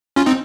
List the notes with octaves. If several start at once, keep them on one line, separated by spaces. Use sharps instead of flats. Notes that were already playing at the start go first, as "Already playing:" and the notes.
C#4 F4
C4 D#4